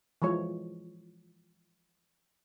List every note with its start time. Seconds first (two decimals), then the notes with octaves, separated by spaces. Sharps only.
0.22 E3 F3 G#3 C#5